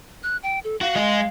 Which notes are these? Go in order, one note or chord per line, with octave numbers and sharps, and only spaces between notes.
F#6
G5
A4
F#4 F5
G#3 D#5